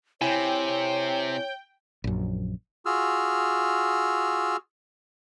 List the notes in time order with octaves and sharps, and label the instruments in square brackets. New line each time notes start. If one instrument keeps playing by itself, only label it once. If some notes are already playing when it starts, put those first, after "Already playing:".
[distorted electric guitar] C3 [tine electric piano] E4 G#5 [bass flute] C#5 [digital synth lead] G5
[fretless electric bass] A#1 F#2
[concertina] F4 F#4 G#4 E6 F6